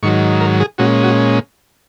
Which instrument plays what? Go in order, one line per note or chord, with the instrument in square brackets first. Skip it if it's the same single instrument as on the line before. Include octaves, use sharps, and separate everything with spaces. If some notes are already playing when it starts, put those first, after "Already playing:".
[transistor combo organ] G#2 D#3 F#3 C#6
A#4
G#4
A#2 G#3 C#4 F#4
F#4